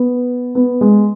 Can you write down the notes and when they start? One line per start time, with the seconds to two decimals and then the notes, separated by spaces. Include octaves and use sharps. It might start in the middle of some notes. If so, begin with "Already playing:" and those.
Already playing: B3
0.55 B3
0.81 G#3